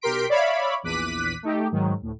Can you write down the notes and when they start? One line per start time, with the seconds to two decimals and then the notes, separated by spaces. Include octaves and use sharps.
0.01 B1 G4 A#4 C6 B6 D7
0.29 C#5 D5 E5 F5 B5
0.83 A#1 E2 D6 F#6 B6 D#7
1.43 A3 D#4 G4
1.72 G#2 D#3 F#3
2.01 D2 A2